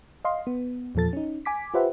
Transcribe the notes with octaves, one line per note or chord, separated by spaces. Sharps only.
D#5 F5 C6
B3
E2 A#2 F3 A4 A6
C#4 D#4
G#5 D6 B6
F4 G4 B4 C5 E5 F#5